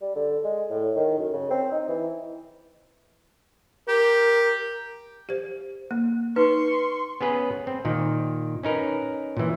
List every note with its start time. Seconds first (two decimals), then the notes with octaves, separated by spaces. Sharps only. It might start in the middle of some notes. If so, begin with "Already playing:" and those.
0.02 G3
0.15 D3
0.44 G#3
0.70 A2
0.96 D#3
1.18 F#2
1.33 C#3
1.50 C4
1.72 D#4
1.89 E3
3.88 G4 A#4
5.29 G4 C5
5.91 A#3
6.36 D#4 B4 C6 C#6
7.21 B3 C#4 G#4 B4
7.67 C4
7.85 A#2 D#3 A#3
8.63 C#4 D#4 A#4 B4
9.37 A#2 E3